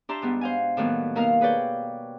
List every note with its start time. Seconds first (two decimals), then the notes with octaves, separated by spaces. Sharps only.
0.09 D4 G4 E5 A5 A#5 C6
0.22 G#2 G3 B3
0.41 C5 F5 G#5
0.77 A2 D#3 F#3 G3 A#3 B3
1.15 B2 A#3 D#4 A#4 F5
1.41 G#4 B4 C#5 D5 G5